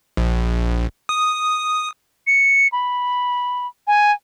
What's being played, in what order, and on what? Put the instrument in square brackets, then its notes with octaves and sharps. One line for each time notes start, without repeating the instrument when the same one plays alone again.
[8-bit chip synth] A#1
D#6
[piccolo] C#7
B5
G#5